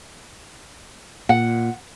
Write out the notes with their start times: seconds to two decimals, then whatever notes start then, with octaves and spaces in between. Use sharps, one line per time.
1.29 A#2 F#5